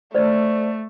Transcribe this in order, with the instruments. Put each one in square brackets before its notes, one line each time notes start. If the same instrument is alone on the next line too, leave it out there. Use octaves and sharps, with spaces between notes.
[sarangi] A3 [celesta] C5 D5